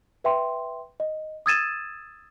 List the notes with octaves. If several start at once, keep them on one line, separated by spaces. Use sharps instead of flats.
B4 E5 G5 C6
D#5
D#6 E6 G#6 A6 D#7 E7